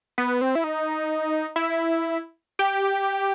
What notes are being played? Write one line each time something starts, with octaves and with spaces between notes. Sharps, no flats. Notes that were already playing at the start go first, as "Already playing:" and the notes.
B3
C4
E4
D#4
E4
G4